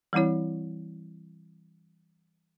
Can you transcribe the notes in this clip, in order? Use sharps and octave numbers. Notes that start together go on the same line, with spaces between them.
E3 G3 C4 E4 C#5